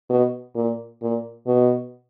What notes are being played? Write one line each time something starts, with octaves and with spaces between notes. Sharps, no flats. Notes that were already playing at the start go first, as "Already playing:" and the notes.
B2
A#2
A#2
B2